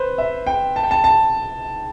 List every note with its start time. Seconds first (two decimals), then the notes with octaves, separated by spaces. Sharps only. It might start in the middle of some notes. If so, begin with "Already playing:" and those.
Already playing: B4 C5
0.18 E5
0.47 G5
0.76 A5
0.83 G5
0.91 A5
1.04 A5